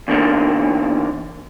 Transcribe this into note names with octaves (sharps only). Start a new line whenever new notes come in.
E2 D3 A#3